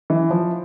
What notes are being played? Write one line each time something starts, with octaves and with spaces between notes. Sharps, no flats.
E3
F3